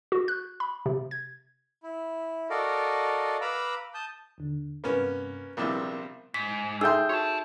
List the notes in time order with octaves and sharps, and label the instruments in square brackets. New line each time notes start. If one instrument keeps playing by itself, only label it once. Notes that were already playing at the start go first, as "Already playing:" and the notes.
[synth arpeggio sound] F#4
F#6
B5
C3
G#6
[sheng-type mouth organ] E4
F#4 A4 A#4 D5 D#5 F5
B4 F5 A#5 B5 D6 E6
A5 D#6 G6
[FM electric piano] D#2 D3
[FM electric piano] G2 C3 B4 [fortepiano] A#3 B3 C#4
[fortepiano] A#1 C3 G3 [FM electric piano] B3 E4 A#4
[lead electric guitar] G#2 [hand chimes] B6
[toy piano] D#4 A4 E5 [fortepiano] G#4 G5 C6 [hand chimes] E6 G6
[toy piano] F#4 [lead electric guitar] C#5 A5